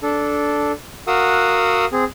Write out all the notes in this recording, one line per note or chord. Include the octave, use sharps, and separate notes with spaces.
D4 A4
F#4 A#4 F5 F#5 D#6 E6
C4 G#4